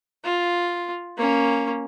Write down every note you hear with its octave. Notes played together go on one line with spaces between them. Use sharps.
F4
A#3 C#4